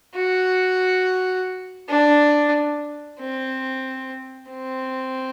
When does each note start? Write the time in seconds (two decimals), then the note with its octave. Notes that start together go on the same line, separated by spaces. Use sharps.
0.16 F#4
1.89 D4
3.20 C4
4.50 C4